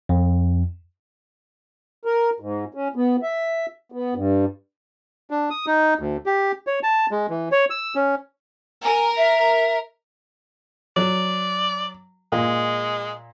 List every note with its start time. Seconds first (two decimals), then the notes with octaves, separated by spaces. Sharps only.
0.09 F2
2.05 A#4
2.40 G#2
2.75 C#4
2.96 B3
3.23 E5
3.92 B3
4.15 G2
5.30 D4
5.50 D#6
5.66 D#4
5.99 D2
6.26 G4
6.67 C#5
6.83 A5
7.11 G#3
7.29 E3
7.52 C#5
7.70 E6
7.95 C#4
8.84 A#4 G#5
9.17 E5
10.96 F#3 D5
12.32 A#2 G#3